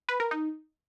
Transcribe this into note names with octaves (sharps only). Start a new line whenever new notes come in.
B4
A#4
D#4